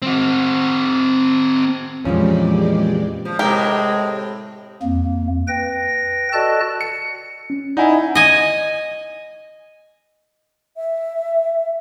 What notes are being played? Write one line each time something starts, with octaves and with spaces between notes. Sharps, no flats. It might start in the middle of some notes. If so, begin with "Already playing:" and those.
C4 F#4
F2 A#2 E3 F3 G#3 C#4 G4 D5
F3
A2 C3 G#3 G4 A#4
F2 A#3
B4 G5 A#6
F#4 A4 D5 D#5 A5 F#6
C#7
C#4
D#4 E4 D5 F#5 G#5
D#5 G#5
E5